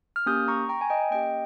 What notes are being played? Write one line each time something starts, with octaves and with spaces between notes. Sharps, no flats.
F6
A#3 C#4 G4 D#6 G6
A#5 C#6
G5 A#5
G#5
D#5 G5
A#3 C#4 G4 D#5 G5